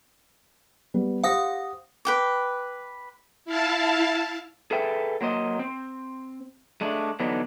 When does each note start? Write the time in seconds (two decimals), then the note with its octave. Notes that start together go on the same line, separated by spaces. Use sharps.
0.94 G3 B3
1.24 G4 C5 F5 F#5 D#6 A#6
2.05 B4 G5 D6
3.45 E4 F5 A5
4.71 G#4 A4 B4 E5 G5
5.21 F#3 A#3 C5 D#5
5.59 C4
6.81 G#3 A3 D4
7.20 D3 E3 F#3 B3 D4 D#4